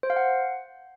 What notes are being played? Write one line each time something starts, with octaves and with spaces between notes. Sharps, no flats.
C5
F5
F#5